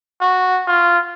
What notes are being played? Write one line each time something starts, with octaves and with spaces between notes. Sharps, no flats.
F#4
F4